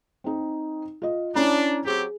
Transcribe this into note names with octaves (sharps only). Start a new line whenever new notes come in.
C4 D#4
F4 D#5
C#4 D4 E4 A#5
F#3 C4 G4 G#4